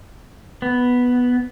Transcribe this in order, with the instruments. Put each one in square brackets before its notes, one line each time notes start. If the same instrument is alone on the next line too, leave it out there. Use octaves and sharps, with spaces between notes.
[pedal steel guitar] B3